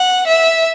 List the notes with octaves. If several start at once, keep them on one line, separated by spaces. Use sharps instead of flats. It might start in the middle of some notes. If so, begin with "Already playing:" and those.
Already playing: F#5
E5